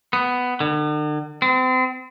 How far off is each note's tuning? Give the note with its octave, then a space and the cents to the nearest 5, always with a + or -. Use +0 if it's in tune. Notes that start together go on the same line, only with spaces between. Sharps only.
B3 +10
D3 +45
C4 -35